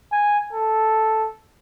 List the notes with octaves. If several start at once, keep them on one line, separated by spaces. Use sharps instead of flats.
G#5
A4